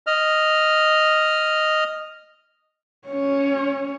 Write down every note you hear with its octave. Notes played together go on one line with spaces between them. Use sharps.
D#5 F6
C#4 C#5